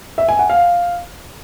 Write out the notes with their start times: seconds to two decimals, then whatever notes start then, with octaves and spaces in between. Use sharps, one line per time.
0.18 E5
0.28 G#5
0.39 F#5
0.50 F5